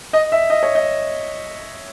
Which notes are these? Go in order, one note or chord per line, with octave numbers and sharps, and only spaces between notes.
D#5
E5
D#5
C#5
D#5